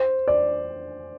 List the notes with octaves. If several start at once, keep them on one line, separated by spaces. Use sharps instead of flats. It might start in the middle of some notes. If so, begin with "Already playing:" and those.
Already playing: C5
D5